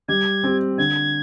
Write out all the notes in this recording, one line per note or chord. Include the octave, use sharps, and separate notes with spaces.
G3 G#6
C4 G4
D3 G#6